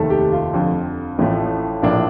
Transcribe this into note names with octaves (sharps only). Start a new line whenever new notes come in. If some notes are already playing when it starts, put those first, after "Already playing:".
Already playing: F1 D#2 D#3 A3 A4
G4
F4
F2 D3 F3
A1 A2 F3 A3
A#1 A2 F3 A#3 D4